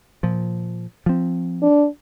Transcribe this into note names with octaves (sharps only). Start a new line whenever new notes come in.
A#2 F3
F3 C4
D4